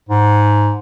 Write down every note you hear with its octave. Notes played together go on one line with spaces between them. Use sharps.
G#2